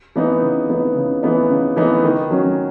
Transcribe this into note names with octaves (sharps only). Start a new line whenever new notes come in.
E3 B3 D#4
C#3
E3 B3 D#4
C#3
E3 B3 D#4
C#3
E3 B3 D#4
D#3
F#3 C#4